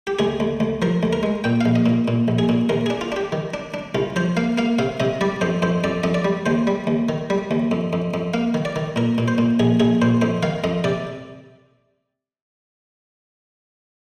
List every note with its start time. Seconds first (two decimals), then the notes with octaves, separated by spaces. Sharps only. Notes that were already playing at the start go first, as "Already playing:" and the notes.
0.07 G4
0.19 D2 G#4
0.40 D2
0.60 D2
0.82 F3 A#4
1.03 D2
1.13 A#4
1.23 G#3
1.44 A#2 G5
1.61 A#1 F5
1.76 D#5
1.86 A#2
2.08 A#2
2.28 A#1
2.39 G#4
2.49 A#2
2.69 D#2 A#4
2.86 D4 G#4
3.01 F4
3.12 D4 G4
3.32 D#3
3.54 D4
3.74 D4
3.95 C2 F4
4.16 F3 C5
4.37 A#3 F5
4.58 A#3 F5
4.79 C3 F5
5.00 C3 D#5
5.21 G3 D5
5.41 F2 C5
5.62 F2 C5
5.84 F2 D5
6.04 F2 D#5
6.14 D5
6.25 G3
6.46 D#2 C5
6.67 G3
6.87 D#2
7.09 D#3
7.30 G3
7.51 D#2
7.71 F2
7.93 F2
8.14 F2
8.34 A#3 F5
8.54 D#3
8.65 D5
8.76 D#3
8.96 A#2 A#4
9.18 A#2
9.28 C5
9.38 A#2
9.59 A#1 G#4
9.80 A#1 G#4
10.02 A#2 C5
10.22 F2 C5
10.43 D#3 F5
10.64 F2 D#5
10.84 C3 D5